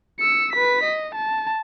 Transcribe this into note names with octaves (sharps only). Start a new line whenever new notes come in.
E6 C#7
B4 B6
D#5
A5